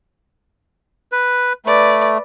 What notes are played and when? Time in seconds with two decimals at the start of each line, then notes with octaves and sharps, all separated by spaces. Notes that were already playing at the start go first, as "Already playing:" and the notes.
1.12 B4
1.66 A3 B4 D5